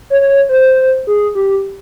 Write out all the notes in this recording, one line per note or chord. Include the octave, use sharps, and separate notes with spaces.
C#5
C#5
C5
G#4
G4